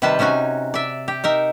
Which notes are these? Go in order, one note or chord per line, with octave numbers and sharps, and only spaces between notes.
C3 D#3 G3 B4 C5 A5
C3 C#4 D#4 F#4 G#5
D5 E5
G4
D#4 A#4 E5